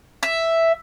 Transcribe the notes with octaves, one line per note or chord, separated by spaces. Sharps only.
E5